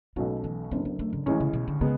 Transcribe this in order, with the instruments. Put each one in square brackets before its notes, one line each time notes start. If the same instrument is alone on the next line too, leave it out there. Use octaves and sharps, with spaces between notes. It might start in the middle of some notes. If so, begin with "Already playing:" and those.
[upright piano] B1 B2 A3 C#4 F#4 [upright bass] G#3
[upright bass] E3
[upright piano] F#1 F#2 D3 [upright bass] B3
[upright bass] B3
A3
C#3
[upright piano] A1 A2 G#3 C#4 [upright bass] E3
[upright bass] C#3
B2
D3
[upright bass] C#3 [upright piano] G#3 B3